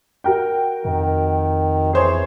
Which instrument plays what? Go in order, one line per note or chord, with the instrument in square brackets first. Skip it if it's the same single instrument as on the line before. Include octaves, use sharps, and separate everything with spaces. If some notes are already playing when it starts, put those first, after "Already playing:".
[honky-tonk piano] F#4 A#4 G5
[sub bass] F2 [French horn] D#3
[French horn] E3 [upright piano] G#4 C5 C#5